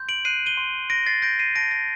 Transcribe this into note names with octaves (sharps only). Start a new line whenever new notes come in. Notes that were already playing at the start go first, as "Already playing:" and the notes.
Already playing: C6 G6
D7 F#7
F#6 C7 D#7
D#7 G7
C6
C6 A#6 D7
A6 C7
G6 A#6 D7
C7 D#7
A5 A#6 D7
A#6 D7